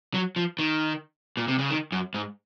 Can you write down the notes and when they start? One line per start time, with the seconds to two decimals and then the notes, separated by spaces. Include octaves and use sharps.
0.14 F#3
0.36 F3
0.59 D#3
1.37 A#2
1.48 C3
1.59 C#3
1.70 D#3
1.92 F#2
2.14 G#2